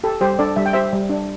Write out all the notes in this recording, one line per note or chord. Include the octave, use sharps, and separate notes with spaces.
G4 A4
G3 G4 C5
D4 A4 D5
G3 E5
G5
G4 C5 E5
G3
D4